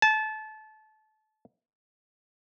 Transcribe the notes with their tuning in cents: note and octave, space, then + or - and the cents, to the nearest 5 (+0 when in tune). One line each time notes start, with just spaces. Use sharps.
A5 -25